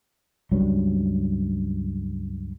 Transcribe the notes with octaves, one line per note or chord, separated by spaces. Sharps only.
C#2 G2 F#3 G3